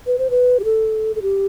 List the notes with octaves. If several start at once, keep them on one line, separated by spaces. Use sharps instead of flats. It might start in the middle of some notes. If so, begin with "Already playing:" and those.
B4
C5
B4
G4
A4
A4
G4